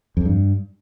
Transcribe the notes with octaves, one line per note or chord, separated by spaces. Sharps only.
F2
G2